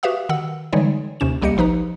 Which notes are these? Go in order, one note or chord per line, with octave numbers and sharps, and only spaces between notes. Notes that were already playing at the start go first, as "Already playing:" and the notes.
F#4 G4 B4 E5 F5 D#6
D#3 F#5 E6
D3 E3 G3 G#3 D#4 C#5
D#2 C3 C#4 E7
C#2 G3 A#3 G4 D#5 C#7
A1 F3 D#4 B4 A#5